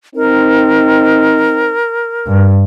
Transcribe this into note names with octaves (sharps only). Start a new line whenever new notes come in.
C4 D#4 A#4
G2